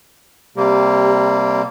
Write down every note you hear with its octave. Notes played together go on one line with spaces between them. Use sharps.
C3 G3 A#3 G4